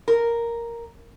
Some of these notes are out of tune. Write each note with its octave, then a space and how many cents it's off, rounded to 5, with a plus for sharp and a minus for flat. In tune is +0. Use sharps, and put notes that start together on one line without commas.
A#4 +0